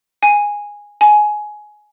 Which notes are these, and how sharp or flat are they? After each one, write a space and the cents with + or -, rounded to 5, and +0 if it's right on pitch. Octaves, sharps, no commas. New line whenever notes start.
G#5 -10
G#5 +15